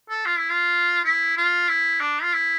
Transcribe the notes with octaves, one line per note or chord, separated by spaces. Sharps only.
A4
F4
E4
F4
E4
F4
E4
D4
F4
E4